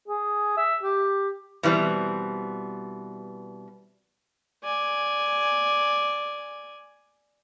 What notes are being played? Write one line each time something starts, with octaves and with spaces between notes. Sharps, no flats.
G#4
E5
G4
B2 E3 G3 C4
D5 G#5